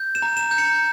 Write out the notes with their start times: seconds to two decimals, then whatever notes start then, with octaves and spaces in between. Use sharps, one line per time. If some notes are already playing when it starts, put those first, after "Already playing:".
Already playing: G6
0.15 E7
0.22 A#5
0.37 E7
0.51 G6
0.58 C#7